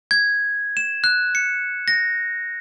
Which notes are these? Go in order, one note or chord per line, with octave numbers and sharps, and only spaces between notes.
G#6
E7
F#6
C#7
A#6